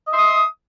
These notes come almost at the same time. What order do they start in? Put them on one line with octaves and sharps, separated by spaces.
D#5 E5 C6 D#6